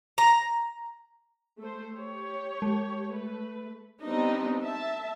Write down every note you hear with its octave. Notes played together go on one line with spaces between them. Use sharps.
A#5
A3 C5
G4 C#5
G#3
A3 B4
G3 B3 C4 D4 D#4
E5 A5